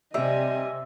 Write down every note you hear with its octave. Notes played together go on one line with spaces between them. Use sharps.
C3 G3 D#5 E5 G#5